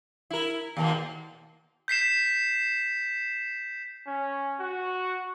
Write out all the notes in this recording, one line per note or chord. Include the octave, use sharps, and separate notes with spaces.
E4 A#4
D#2 B2 A#3
G6 B6 C7 E7
C#4
F#4